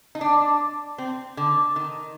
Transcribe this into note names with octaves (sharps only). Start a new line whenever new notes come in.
D#4
D4
C4
D3
D#3